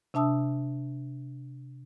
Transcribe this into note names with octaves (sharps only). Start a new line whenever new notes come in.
C3 D4 E5 A5 D#6 E6